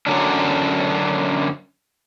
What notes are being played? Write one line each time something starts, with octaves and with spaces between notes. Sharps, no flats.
F#2 A#2 D3 F#3 C#4 D4